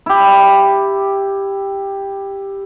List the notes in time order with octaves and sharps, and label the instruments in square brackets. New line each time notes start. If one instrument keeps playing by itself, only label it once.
[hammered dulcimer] E4 G4